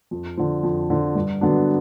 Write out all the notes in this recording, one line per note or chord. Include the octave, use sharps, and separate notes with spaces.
F2
D3 F3
F2
D3 F3
G2
D3 F#3 B3 D4